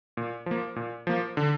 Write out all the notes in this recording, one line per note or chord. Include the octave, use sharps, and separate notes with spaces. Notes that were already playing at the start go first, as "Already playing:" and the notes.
A#2
F3 A#3
A#2
F3 A#3
D3